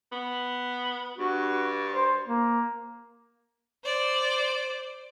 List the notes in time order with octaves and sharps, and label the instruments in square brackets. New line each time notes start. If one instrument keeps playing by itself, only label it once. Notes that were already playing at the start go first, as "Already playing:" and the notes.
[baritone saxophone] B3
[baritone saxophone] G2 [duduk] F#4
[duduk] C5
A#3
[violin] C5 D5